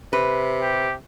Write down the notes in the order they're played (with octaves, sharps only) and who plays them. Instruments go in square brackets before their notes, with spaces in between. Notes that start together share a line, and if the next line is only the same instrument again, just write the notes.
[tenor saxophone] C3 [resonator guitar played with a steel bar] B4
[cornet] G4